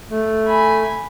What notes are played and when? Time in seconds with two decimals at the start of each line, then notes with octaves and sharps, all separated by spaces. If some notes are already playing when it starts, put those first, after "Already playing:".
0.11 A3
0.47 G#5 B5